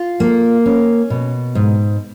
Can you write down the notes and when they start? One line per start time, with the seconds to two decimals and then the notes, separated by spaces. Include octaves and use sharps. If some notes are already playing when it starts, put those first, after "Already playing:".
Already playing: F4
0.20 A#3
0.66 C#4
1.10 B2
1.55 G#2